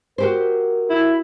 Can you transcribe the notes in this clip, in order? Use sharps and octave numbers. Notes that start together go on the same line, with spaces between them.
F#4 G4 A#4 C5
E4